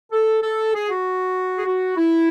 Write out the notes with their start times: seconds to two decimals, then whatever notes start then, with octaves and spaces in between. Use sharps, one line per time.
0.12 A4
0.43 A4
0.74 G#4
0.89 F#4
1.57 G#4
1.66 F#4
1.97 E4